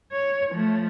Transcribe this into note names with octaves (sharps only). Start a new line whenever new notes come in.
C#5
F3 A3